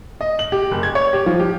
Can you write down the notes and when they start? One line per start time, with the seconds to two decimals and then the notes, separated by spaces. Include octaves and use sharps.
0.21 D#5
0.39 F#7
0.52 G4
0.72 F#1
0.83 G#6
0.95 C#5
1.13 G4
1.26 F3
1.39 G4